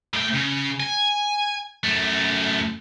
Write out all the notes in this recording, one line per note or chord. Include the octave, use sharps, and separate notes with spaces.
A2 G5
C#3
G#5
F#2 A3